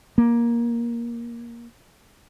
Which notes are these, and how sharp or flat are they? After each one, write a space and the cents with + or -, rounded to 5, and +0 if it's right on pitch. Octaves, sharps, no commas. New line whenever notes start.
A#3 +15